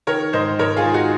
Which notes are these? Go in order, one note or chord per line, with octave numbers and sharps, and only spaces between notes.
D#3 A#4 C#5
G#2 C5 D#5
G#2 A#4 C#5
F4 G#4
D#3
D#4 F#4